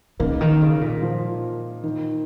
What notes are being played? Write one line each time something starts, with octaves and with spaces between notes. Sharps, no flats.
C#3 A#3 D#4
D#3
C#3
A#2
F3
D#3